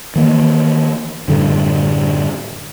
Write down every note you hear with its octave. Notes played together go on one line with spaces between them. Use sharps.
D#3 E3 A#3
F#2 A2 D3 G3